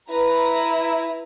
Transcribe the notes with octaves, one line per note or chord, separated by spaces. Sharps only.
E4 B4 A#5